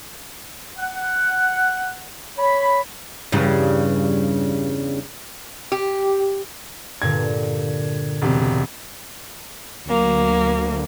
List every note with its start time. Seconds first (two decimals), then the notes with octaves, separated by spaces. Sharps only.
0.77 F#5
2.38 C#5 B5
3.32 E2 G2 C#3
5.72 G4
7.02 G2 A#2 D3 G#6
8.22 E1 C3
9.86 D2 F#3 A#3